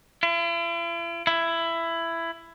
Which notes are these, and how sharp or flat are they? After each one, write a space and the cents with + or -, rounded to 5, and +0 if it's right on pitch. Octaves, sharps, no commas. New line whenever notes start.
E4 +45
E4 +15